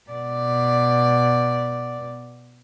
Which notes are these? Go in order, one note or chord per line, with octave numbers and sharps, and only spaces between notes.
B2 D5